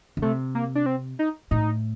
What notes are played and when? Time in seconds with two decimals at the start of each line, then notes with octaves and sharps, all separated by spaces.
0.17 D3
0.22 C3 A3
0.55 A#3
0.75 D4
0.86 C4
1.19 D#4
1.51 A2 D#4